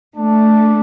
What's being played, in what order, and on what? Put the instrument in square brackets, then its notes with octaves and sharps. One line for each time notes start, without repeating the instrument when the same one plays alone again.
[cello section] A3 [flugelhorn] D4